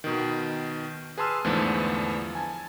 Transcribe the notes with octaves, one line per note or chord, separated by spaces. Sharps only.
B2 D#3
G#4 B4 A5 C6 E6 F6
E2 G#2 D3 F3 A3 B3
G#5 A5